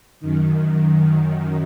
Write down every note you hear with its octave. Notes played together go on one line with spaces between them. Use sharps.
F#2 D#3